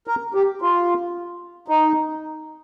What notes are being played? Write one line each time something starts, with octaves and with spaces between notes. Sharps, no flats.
A#4
G4
F4
D#4